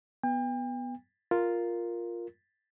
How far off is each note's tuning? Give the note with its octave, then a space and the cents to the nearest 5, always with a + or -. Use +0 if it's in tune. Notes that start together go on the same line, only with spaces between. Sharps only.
B3 +0 G5 +40
F4 +0 A#4 +0